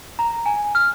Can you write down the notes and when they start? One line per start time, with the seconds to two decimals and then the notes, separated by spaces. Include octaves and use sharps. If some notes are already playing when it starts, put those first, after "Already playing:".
0.19 A#5
0.46 G#5
0.75 F6